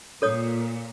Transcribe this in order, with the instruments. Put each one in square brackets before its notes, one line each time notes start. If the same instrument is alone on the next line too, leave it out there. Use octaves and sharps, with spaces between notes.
[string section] A#2 [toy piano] A4 C#5 D#6